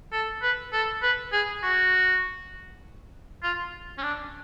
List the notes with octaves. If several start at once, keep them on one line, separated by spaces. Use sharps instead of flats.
A4
B4
A4
B4
G#4
F#4
F4
C#4
D4